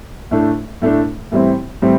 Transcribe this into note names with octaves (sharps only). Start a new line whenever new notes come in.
A2 A3 D4
A2 A3 D4
A2 E3 G3 C4 E4
A2 E3 G3 C4 E4